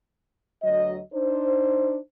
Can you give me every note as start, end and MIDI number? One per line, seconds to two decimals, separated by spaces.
0.62 0.98 38
0.62 0.98 54
0.62 0.98 75
1.13 1.97 62
1.13 1.97 63
1.13 1.97 72